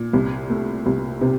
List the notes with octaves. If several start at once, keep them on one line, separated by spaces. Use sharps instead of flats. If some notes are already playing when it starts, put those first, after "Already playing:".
Already playing: A#2
C2
A3
C2
C3